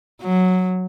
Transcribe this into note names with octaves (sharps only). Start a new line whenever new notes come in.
F#3